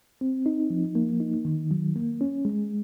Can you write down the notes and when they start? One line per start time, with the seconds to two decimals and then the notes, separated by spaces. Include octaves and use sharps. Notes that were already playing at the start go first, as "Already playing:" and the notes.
0.21 C4
0.46 D#4
0.70 F3
0.95 A#3
1.20 D#4
1.45 D#3
1.71 F#3
1.96 A#3
2.21 C#4
2.45 G#3